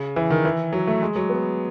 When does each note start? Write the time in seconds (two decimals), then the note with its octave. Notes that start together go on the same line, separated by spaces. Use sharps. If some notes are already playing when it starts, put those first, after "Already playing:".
Already playing: C#3
0.16 E3
0.30 D#3
0.45 E3
0.73 F#3
0.87 A3
1.02 G#3
1.16 F#3
1.29 B3